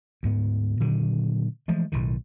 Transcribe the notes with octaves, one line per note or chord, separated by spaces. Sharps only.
D2 G#2 B3
A#2 D3 D#3 F#3
E3 F3 G#3 A3
B1 A2 D#3